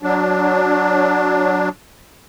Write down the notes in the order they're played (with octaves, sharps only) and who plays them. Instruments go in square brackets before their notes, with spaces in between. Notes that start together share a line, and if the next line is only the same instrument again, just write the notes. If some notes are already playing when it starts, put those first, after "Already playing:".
[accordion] F#3 D4